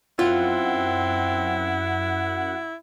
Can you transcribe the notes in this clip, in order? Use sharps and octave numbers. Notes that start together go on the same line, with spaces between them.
F#2 C4 E4 F4 F#5